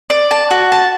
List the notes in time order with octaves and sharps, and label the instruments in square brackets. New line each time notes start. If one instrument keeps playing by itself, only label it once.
[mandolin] D5
A5
F#4
A5